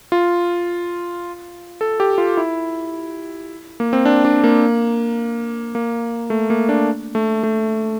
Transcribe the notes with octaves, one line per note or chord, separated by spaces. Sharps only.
F4
A4
G4
F4
E4
A#3
C4
D4
D4
A#3
A#3
A3
A#3
D4
A3
A3